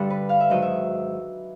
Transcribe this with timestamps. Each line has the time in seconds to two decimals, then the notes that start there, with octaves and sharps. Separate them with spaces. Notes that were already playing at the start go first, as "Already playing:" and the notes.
Already playing: G2 D3 G3
0.10 B4
0.29 F5
0.40 E5
0.49 G#2 D#3 F#3 D#5
0.62 E5